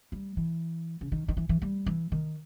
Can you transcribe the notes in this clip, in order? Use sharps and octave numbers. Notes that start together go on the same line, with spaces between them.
G3
E3
C#3
D#3
D#3
E3
E3
G3
E3
D#3